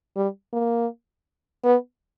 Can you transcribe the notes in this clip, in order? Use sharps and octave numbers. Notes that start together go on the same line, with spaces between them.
G3
A#3
B3